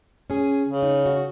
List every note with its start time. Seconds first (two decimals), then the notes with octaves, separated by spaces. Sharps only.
0.30 C#4 G#4
0.67 C#3
0.83 D#4
1.06 F#4